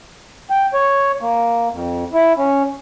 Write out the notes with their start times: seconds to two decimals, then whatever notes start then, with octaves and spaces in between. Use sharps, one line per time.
0.50 G5
0.73 C#5
1.21 A#3
1.72 F2
2.13 E4
2.38 C#4